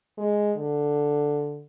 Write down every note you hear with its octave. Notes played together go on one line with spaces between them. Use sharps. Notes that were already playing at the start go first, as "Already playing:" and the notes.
G#3
D3